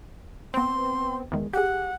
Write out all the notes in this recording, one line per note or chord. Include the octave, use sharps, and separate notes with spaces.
B3 C4 C6
E2 D#3 G#3
G4 G#4 F#5